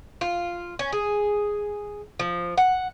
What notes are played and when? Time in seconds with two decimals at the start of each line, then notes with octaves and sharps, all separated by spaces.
0.21 F4
0.79 C#4
0.92 G#4
2.19 F3
2.57 F#5